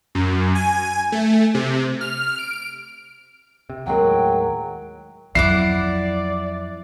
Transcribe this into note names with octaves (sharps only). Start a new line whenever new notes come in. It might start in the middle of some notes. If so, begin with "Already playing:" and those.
F#2
G#5
A3
C3
F6
D7
C3
D#2 A2 F#3 G#3 A#4 F#5 G5
F2 F#3 E4 D5 F#5 D6 C7